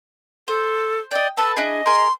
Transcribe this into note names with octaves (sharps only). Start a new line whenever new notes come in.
A4 C5
D5 D#5 G5
A4 B4 A5 E6
D4 E4 G#4 D#5
G#4 A#4 C6